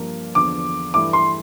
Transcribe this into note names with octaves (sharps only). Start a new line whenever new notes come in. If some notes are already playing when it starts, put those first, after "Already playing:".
Already playing: G2 F3 A#3
E2 D3 F3 D6
G2 E3 A3 E4 D6
C6